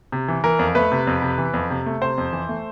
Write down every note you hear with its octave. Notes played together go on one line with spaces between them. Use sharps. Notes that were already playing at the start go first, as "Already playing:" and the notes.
C3
E3
E3 A#4
F2
A3 B4
C3
F2
C3
E3
F2
C3
A3
C3 C5
F2
E3
A3